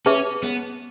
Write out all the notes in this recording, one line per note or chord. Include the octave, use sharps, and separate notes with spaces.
C#4 G#4 B4 E5 A5 C#6
B3